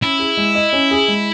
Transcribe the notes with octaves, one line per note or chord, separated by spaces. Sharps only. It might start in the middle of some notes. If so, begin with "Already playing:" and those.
C#4 E4
G#4
G#3
D#5
C#4
G#4
G#3